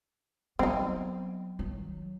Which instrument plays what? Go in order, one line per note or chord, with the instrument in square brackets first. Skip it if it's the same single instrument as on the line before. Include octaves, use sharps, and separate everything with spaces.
[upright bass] F#3 B3 [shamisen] C4 D#4
[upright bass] D#3 F#3